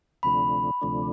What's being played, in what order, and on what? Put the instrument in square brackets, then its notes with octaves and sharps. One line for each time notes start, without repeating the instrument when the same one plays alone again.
[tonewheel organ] D2 C3 F3 A3 D4 [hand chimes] B5
[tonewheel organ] D2 C3 F3 A3 D4